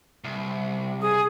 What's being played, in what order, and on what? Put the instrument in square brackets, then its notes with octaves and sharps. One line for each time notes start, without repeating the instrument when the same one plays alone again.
[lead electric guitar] C2
[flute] G#4 [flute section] D#6